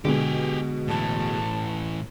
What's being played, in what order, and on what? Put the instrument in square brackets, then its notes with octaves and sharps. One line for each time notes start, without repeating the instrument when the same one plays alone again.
[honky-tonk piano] B2 G#3 [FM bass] D3 [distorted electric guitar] G4 G#4
[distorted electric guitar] A2 E3 [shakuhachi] A5